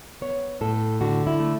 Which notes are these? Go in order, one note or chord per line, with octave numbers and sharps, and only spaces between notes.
B3 C#5
A2 A4
D3 F#4
E4
A3